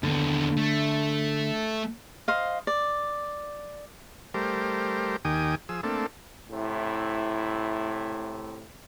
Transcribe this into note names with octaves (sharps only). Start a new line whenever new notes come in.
D#2 D3 B3
A3
C5 D#5 F5
D5
G3 A3 G4 A#4 C5
D#2 D#3 G4 G5 G#5 D#6
F3 G#4 E6
A3 A#3 C4 D4 A4
A2 C3 E4